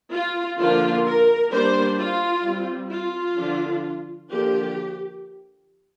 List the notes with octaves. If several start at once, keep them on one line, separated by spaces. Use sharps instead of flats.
F4
D3 F3 A#3 D4 F4
A#4
G3 A#3 D4 C5
F4
G3 C4
F4
D3 F3 D4
D3 F3 A#3 D4 G4